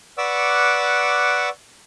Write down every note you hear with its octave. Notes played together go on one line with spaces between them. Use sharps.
B4 D5 F#5 C#6 D6 E6